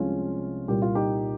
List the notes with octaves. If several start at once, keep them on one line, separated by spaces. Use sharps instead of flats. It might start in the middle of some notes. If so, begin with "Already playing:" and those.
Already playing: C2 C3 F3 G#3 C#4 F4
C2 A#2 G3 A#3 G4
F4
D#4 G4